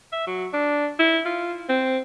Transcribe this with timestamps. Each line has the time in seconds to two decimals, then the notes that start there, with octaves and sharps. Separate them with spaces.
0.12 E5
0.27 F#3
0.53 D4
0.99 E4
1.25 F4
1.69 C4